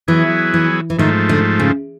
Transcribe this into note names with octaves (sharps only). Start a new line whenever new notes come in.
E3 F#3 B3 E4 G#4
E3
E3
G#2 D#3 F3 A3
D3
C#3